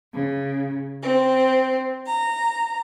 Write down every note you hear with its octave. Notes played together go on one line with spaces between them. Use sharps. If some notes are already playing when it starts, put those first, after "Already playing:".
C#3
C4
A#5